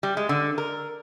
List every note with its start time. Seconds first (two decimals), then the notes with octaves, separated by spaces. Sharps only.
0.03 G3
0.17 G#3
0.29 D3
0.58 A#4